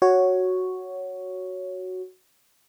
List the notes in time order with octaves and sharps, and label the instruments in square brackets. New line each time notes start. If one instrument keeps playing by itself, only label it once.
[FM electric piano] F#4 C#5